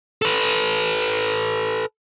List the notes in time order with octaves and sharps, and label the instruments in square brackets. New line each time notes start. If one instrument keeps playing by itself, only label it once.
[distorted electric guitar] A4 B4